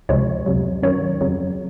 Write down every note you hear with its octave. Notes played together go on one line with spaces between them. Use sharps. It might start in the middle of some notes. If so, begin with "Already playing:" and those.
C#2 C3 F3 G#3 C#5
F2 C3 F#3
F#2 D#3 F#3 C#5
F2 C#3 F#3